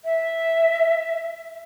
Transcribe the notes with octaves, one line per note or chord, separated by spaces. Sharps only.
E5